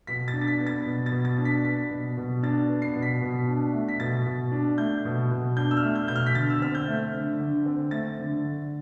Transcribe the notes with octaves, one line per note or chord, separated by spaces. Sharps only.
B2 B6
A6
D4
A6
B6
B3
A6
B2
A6
B2
A6
D4
B6
B3 B6
B2
B2
D4 A6
B3
C7
B2
B6
B2
D4
A3
B6
B2 A6
B2
D4
A3 G6
B2
B2
D4 G6
E6
F6
A3
G6
B2 G6
F6
B6
D3 A6
E6
C4 F6
G6
A3
D3
D3
C4
A3 A6
D3
D3